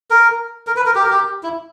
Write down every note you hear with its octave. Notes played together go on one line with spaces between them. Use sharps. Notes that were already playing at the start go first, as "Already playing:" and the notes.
A#4
A#4
B4
A#4
G4
A#4
G4
E4